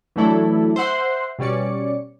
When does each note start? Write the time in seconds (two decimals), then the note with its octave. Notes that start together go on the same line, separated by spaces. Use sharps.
0.16 E3 F#3 A3 D4 E4 A4
0.76 C5 E5 F#5 C6
1.39 B2 G3 C#4 D5 C#7